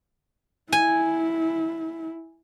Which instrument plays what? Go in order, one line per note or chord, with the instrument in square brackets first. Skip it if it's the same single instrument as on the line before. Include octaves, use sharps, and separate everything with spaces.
[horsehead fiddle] E4 [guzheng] G#5